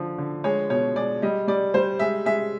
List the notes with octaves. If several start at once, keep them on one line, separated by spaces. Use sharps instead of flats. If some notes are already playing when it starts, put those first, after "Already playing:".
Already playing: D3 F3
D3
G#3 C#5
B2 C#5
G#3 D5
G3 D#5
G3 D5
G3 C5
G#3 E5
G#3 E5